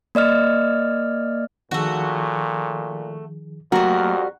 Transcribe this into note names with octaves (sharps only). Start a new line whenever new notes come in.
A#3 D5 D#5 F6
A#2 D#3 F3 A3 F#4 G#4
F2 F#3 G3 A3 A#3 F#4 A#4